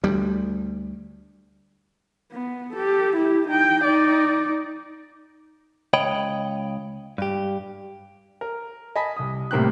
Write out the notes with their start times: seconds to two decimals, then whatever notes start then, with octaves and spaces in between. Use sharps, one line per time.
0.03 D2 G3
2.32 B3
2.73 G4 A4
3.16 E4 G4
3.47 D#4 G5
3.84 D#4 D5
5.94 C#2 C#5 D#5 G5 B5
7.18 G2 G4
8.41 A#4
8.96 D#5 G#5 A5 B5 B6
9.16 C2 D#6
9.51 C2 A2 A#3 C4 G4 F#6